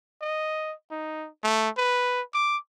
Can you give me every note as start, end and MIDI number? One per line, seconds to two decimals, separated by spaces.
0.22 0.73 75
0.91 1.28 63
1.44 1.69 57
1.78 2.22 71
2.34 2.57 86